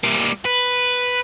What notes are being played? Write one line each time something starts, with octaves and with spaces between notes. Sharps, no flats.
G3 A#3
B4